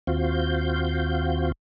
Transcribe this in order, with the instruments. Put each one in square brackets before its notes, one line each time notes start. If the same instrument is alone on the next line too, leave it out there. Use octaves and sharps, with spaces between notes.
[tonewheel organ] D#2 C4 F4 F#4 F5 G6